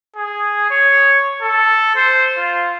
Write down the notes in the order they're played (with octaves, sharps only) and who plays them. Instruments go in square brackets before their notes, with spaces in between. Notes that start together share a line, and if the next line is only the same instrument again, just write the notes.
[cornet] G#4
C#5
A4
C5
F4